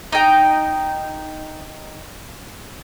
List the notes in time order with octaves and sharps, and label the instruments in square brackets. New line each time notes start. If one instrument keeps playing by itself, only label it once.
[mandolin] D#4 G5